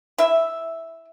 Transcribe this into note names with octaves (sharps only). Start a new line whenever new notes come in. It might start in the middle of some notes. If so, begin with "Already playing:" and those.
E4 E5